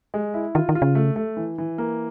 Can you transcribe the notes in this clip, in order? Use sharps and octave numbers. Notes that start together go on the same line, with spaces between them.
G#3
E4
D#3 F4
D#3
F4
C#3
A3
A3
E3
E3
A#3